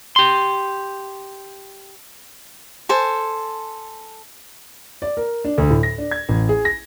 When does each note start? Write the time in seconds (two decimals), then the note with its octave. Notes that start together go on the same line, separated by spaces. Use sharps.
0.16 G4 C6
2.89 A4 C5 G#5
5.02 D5
5.17 A#4
5.44 D4
5.58 D2
5.70 A2
5.83 A#6
5.98 D4
6.11 G#6
6.29 A1
6.49 G#4
6.65 A#6